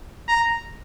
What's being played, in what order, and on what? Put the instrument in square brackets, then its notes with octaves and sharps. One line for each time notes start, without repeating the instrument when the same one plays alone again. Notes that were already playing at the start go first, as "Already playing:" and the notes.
[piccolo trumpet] A#5